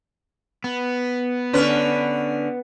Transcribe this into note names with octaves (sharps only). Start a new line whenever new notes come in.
B3
D3 C#4 B4